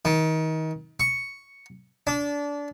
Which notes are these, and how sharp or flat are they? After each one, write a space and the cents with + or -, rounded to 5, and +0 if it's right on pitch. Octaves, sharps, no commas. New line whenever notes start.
D#3 +30
C#6 +0
D4 -25